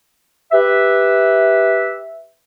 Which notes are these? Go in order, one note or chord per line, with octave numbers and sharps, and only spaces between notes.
G4 B4 E5